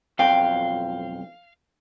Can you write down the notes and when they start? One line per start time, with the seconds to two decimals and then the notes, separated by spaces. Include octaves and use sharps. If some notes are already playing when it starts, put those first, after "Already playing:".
0.19 B1 F2 F5 G5